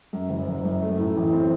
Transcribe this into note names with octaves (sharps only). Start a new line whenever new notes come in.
F#2
F#1
F#1
F#2
A3
A2
A1
C4